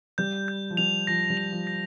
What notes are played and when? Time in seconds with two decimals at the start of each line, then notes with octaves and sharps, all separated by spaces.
0.18 G3 G6
0.48 G6
0.71 F3
0.77 G3 F7
1.07 F3 A#6
1.30 G3
1.37 F7
1.52 F3
1.67 A#6